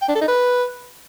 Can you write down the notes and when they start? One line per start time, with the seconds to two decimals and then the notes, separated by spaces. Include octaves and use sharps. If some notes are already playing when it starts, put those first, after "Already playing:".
0.02 G5
0.08 D4
0.15 A4
0.21 D#4
0.28 B4